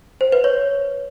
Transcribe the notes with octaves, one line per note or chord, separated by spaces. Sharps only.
C5
B4
C#5